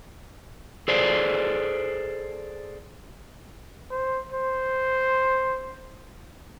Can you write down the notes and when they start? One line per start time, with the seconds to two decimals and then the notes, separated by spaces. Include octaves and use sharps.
0.88 G#4 A4 C5 D5
3.91 C5
4.32 C5